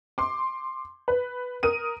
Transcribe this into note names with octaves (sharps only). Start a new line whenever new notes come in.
C6 D6
B4
A#4 D#6 D#7